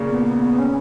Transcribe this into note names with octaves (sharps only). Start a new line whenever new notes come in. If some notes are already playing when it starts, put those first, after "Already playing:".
Already playing: A#2 C#3
B3
B3
B3
C#4